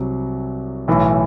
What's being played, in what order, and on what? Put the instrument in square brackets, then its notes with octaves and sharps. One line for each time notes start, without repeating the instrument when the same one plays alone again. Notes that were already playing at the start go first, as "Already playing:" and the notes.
Already playing: [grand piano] C2 C3 F#3
B1 A2 E3